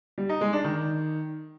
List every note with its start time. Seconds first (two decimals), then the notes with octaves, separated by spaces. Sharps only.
0.18 G3
0.29 D#4
0.41 G#3
0.53 D4
0.64 D#3